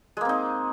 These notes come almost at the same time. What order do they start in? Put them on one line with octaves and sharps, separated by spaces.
G#3 A#3 C4 D#4